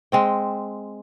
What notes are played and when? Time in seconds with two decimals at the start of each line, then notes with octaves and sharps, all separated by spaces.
0.12 G#3 C4 G5